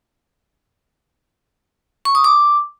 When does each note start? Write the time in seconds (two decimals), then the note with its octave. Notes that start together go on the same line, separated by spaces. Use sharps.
2.05 C#6
2.15 D#6
2.24 D6